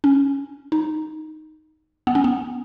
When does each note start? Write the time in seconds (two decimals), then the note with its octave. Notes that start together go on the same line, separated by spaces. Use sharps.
0.04 C#4
0.72 D#4
2.07 B3
2.15 C#4
2.24 B3